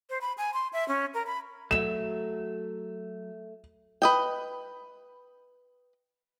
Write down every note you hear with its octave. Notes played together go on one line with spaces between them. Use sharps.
C5
B5
G#5
C6
E5
C#4
A#4
B5
F#3 A3 E5 E7
B4 D#5 G5